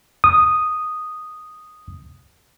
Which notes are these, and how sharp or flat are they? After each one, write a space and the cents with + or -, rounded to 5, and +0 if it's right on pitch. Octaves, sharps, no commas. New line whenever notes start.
D#6 -5